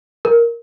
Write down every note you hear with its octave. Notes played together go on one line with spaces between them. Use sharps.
A#4